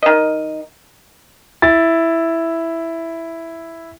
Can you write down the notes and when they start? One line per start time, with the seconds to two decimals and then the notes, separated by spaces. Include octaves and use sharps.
0.03 D#3 D#5
1.62 E4 A6